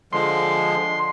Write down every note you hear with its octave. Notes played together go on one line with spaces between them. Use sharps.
D3 F3 G#3 C6